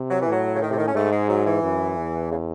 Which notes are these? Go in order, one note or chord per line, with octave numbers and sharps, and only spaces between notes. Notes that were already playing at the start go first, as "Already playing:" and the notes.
Already playing: C3
F#3
E3
A2 F#3
C#3
D#3
C3
D#3
C#4
G#2 A3
G#3
F#3
E3
F#2
E2
C#3